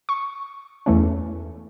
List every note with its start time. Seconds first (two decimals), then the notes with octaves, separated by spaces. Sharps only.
0.09 C#6
0.86 E2 E3 A3 C#4